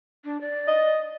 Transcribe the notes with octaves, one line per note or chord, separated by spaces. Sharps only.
D4
D5
D#5